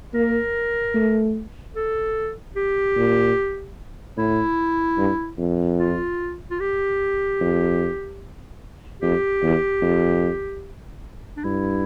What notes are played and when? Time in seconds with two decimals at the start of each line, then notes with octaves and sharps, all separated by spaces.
0.14 A#3 A#4
0.95 A3
1.75 A4
2.56 G4
2.96 A#2
4.17 A2 E4
4.98 G2
5.38 F2
5.79 F4
6.51 F4
6.60 G4
7.41 F2
9.02 F2 G4
9.43 E2
9.82 F2
11.37 D4
11.44 G2 E4